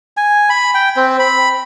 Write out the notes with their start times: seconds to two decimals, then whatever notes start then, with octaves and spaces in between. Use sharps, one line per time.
0.17 G#5
0.50 B5
0.74 G5
0.96 C4
1.19 B5